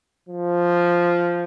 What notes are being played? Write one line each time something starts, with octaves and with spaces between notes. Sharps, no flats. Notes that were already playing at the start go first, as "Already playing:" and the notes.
F3